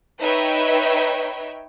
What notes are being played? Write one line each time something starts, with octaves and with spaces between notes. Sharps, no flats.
D#4 B4 C#5 E5 G5